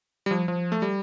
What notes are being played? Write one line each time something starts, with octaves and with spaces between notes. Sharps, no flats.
G3
F3
F3
A3
G3